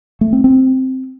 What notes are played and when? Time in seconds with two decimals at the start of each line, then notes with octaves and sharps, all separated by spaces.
0.21 A3
0.33 C4
0.44 C4